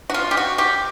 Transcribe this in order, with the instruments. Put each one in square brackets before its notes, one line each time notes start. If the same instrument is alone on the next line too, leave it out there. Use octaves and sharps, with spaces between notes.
[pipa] F#4
F4
G4
F#4
G4